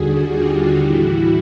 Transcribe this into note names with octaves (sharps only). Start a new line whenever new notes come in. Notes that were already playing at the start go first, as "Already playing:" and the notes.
Already playing: D#2 D3 G3 F#4 G#4
F4 G4
A2 E3 G3 E4 F#4